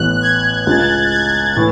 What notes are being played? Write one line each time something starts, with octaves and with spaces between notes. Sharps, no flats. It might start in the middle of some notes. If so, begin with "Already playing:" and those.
Already playing: A1 A2 E3 B3 F#6
F#6
G#6
C#2 C#3 G#3 A6
F#6
G#6
G#6
A2 E3 A6